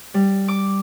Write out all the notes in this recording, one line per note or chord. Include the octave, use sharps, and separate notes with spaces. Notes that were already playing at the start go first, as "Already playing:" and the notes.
G3
D6